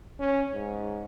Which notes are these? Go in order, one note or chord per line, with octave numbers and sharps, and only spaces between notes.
C#4
G#2